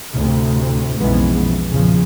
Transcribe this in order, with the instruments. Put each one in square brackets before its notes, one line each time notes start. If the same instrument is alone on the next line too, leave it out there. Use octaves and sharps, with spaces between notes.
[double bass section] D2 A2 C3
B1 F2 C#3 E3 G#3 B3
E2 A#2 C#3 F3